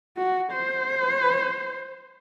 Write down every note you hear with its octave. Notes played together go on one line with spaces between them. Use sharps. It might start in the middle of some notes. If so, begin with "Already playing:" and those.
F#4
C5